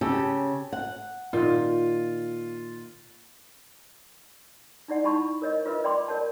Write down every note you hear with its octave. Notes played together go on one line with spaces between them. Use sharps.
C#3 G4 A4
F#5
A#2 D#3 F4
D#4 E4 D5 F#5
D#4 E4 A5 B5 C#6
A#4 C#5 D#5
F4 A#4 B4 D#5 E5
D5 G5 B5 C6 D6
A#4 C#5 D5 A5